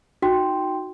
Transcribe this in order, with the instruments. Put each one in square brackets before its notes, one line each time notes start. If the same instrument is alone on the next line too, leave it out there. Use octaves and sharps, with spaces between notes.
[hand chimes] D#4 G5 C6 [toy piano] F#4